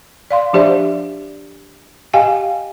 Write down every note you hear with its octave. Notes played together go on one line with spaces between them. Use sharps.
D5 F5 C6
F3 D4 G4 C5 D5 E5
G4 D#5 F5 G5 G#5